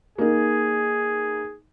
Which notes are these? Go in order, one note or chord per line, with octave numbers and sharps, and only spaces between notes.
A#3 D#4 G#4